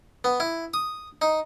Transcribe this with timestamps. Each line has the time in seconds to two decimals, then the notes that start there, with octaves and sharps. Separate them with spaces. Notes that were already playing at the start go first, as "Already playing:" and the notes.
0.24 B3
0.40 E4
0.74 D#6
1.22 D#4